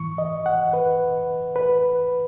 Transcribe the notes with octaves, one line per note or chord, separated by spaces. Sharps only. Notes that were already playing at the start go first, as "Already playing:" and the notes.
Already playing: G#2 E3 C#6
D#5
F#5
B4
B4